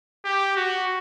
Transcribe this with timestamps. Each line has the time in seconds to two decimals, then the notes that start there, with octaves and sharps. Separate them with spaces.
0.25 G4
0.56 F#4